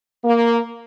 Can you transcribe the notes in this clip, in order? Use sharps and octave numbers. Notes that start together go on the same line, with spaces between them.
A#3